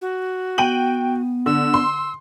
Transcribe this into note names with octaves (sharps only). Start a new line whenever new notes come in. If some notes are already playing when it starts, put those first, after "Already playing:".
F#4
B3 G5 D#7 F#7
D3 E6
C6